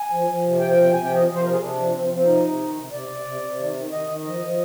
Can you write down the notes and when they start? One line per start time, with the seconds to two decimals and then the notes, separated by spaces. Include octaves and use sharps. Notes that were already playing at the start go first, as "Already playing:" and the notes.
Already playing: G#5
0.11 F3
0.27 F3
0.44 C3
0.60 F3 G5
0.71 G5
0.77 C3
0.83 G5
0.93 C3 G#5
1.04 G5
1.10 F3
1.15 D#5
1.27 F3
1.35 C5
1.43 C3 A#4
1.51 G#4
1.60 C3 D4
1.76 F3
1.92 F3 C4
2.04 C4
2.09 F3
2.15 C4
2.25 C3 D#4
2.42 C3
2.58 D#3
2.75 C3
2.91 C3 D5
3.09 C3
3.25 C3
3.41 C3
3.59 D#3
3.74 D#3
3.91 D#3 D#5
4.08 D#3
4.24 F3 D#5
4.41 F3